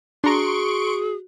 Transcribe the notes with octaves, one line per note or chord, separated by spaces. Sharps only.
D4 F#4 G#4 A#5 C6 C#6 D7